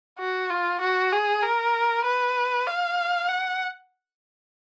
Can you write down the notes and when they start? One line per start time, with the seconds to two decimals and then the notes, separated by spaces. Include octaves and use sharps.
0.19 F#4
0.50 F4
0.82 F#4
1.13 G#4
1.43 A#4
2.05 B4
2.67 F5
3.29 F#5